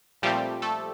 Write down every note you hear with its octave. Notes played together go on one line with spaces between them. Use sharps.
A#2 F3 G3 A3 C4 G4
A3 A4